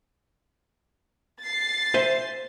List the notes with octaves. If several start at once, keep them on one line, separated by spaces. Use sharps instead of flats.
A6 C7
C5 E5 G#5